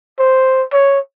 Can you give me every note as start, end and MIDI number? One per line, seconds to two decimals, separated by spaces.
0.19 0.63 72
0.72 0.99 73